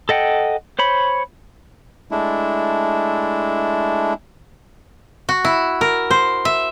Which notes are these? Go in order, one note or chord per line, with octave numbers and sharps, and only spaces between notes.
A4 D#5 F#5 G5
C5 C#5 B5
G#3 A3 D4 E4
F#4
E4
A#4
C5
E5